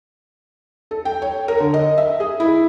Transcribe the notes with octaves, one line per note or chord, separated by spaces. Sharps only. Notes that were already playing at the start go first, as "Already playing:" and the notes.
A4
G5
C#5
A#4
D3
D#5
E5
G#4
E4